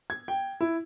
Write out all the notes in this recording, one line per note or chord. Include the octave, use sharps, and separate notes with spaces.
G#6
G5
E4